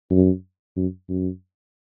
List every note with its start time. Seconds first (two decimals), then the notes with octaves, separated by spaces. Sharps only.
0.10 F#2
0.76 F#2
1.09 F#2